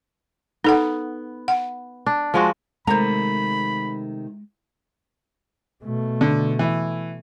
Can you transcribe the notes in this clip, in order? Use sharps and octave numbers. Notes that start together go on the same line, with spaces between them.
B3 D#4 A4 F#5
F#5
D4
F3 G#3 F#4
C3 D#3 G#3 A3 C5 A#5 B5
B2 A3
D3
E3